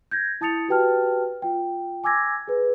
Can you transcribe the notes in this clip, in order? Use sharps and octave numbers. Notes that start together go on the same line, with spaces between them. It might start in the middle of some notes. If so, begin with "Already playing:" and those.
G6 G#6 A#6
E4 A5 D#6 A6 C#7 F7
F#4 G4 B4 G5 A5 F6
F4 G5
G#5 D6 E6 G#6 A#6
G#4 B4